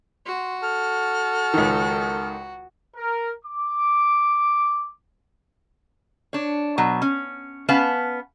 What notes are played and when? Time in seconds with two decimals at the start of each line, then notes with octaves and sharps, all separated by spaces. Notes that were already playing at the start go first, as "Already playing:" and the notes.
0.26 F#4 C6
0.62 A4 F6
1.54 C#2 D#3
2.95 A#4
3.44 D6
6.33 D4 C#5
6.78 B2 F#3
7.02 C#4
7.69 B3 C#4 B4 F5 A5